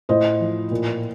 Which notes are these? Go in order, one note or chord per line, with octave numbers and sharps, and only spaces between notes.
A2 C5 D#5
F3
A#2